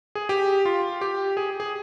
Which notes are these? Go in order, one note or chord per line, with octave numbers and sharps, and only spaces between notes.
G#4
G4
F4
G4
G#4
G#4